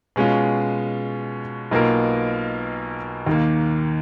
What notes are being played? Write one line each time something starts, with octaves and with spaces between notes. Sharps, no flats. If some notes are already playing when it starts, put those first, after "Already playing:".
B2 G#3 C#4 F4
B1 B2 A#3 F4 A#4
D#2 D#3 A#3